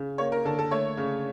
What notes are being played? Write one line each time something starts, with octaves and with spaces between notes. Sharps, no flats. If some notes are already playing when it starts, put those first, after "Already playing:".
Already playing: C#3
A#3 C#5
A#4
D3 A4
A4
A3 C#5
C#3